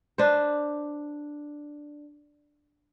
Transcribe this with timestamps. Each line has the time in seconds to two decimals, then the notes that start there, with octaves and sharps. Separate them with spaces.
0.18 D4 B4 C5